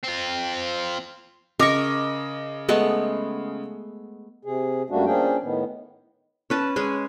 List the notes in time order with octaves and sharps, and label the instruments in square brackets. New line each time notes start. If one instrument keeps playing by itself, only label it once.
[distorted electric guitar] C4 F4
[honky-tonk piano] C#3 D#5 D6 [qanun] A#4 C#6
[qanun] G#3 A3 B3
[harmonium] C3 G#4
F#2 G3 A3 A#3 D4 F#4
F3 A#3 C#4 D4 G#4 G5
A2 D#3 B3
[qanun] C#4 B4 A5
G#3 C#4 G#4